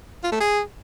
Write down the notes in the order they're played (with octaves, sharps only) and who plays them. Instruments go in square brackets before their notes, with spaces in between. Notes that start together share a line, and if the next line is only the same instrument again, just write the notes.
[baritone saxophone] F4
A3
G#4